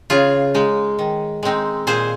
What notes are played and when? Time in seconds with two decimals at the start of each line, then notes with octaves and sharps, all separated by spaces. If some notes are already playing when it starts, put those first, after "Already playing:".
0.10 C#3 F4 G#4
0.54 G#3 D#4
0.99 D#3
1.43 G#3 C4 D#4
1.87 A#2 G#4 C5